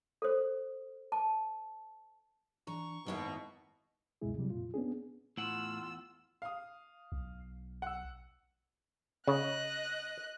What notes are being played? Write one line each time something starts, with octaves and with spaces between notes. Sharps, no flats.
A4 C5
A5
E3 D4 A#5 C#6
G#1 F#2 B2 A#3 E4 E5
C#2 F#2 B2 G#3 E4 G#4
C3 F#3 G3
F2 A#2 F4
B3 C#4 D4 G#4
E2 A2 F4 F#5 E6
F5 D#6
B1
F#5 E6
C#3 D#5 F#6